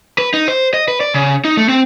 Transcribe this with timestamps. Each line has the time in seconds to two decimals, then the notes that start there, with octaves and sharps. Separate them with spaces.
0.18 B4
0.34 D#4
0.48 C5
0.74 D#5
0.88 B4
1.01 D5
1.14 C#3
1.45 D#4
1.57 A3
1.69 C4